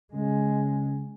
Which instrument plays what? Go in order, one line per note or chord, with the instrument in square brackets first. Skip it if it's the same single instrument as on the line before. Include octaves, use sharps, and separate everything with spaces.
[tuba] C#3 [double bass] G#3